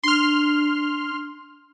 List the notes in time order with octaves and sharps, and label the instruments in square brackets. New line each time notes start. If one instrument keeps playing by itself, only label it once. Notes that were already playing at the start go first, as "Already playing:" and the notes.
[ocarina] D4 [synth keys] C6 F6